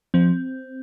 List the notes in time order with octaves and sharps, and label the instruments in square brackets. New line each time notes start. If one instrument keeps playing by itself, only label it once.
[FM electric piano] F3 C4